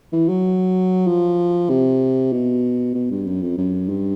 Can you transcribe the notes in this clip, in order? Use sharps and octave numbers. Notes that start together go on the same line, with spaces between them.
E3
F#3
F3
C3
B2
B2
G2
F#2
F2
F#2
G2